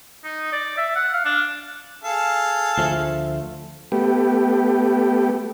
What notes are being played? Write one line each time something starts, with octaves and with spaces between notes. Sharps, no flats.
D#4
D5
E5
F#5
F5
D4
G#4 A4 F5
D2 F3 A3
A3 B3 G4